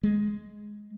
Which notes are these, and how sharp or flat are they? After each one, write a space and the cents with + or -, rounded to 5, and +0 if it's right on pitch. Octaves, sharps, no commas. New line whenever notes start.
G#3 +5